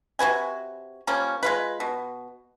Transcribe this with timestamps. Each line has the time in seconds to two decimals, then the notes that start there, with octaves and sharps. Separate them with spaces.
0.19 C3 F#4 B4 G#5
1.07 F3 G3 A#3 C#4
1.43 G#3 F4 B4
1.80 B2